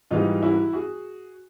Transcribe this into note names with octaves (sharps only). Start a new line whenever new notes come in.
G#2 E3 G3 D#4 F4
E4 F#4
F#4 G#4